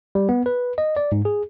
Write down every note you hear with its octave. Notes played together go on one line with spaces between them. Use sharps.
G3
B3
B4
D#5
D5
G#2
G#4